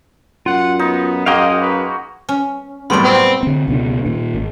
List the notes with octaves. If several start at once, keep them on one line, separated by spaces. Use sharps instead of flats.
F#2 F4 F#5
B3 D#4
F#2 G#3 A#3 F#4 D#5 F5 G5 D#6
B4
C#4
F#2 A2 C3 G3 B3 B5 C6 D7
C4
D3 C4
C#2 B2 C4 D4
A#2 D#3
G#1